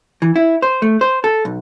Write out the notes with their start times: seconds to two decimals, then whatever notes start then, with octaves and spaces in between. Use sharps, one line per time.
0.22 E3
0.36 E4
0.62 C5
0.82 A3
1.01 C5
1.24 A4
1.45 B1